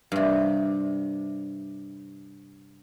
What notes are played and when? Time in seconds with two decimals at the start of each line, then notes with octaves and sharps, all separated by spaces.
0.12 G2 C3